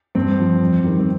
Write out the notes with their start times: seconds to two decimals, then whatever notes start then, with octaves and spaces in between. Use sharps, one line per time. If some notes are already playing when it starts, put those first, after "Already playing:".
0.15 G2 C4
0.39 F3
0.61 F2
0.84 D#3 G3
0.99 C4